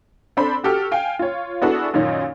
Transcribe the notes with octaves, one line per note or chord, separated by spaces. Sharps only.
C4 D4 A4 C5 B5
F#4 G4 A4 F6
F5 G5 G#5
F4 C#5
B3 D4 E4 F#4 G#4 A4
F#2 A#2 D#3 C#4 D#4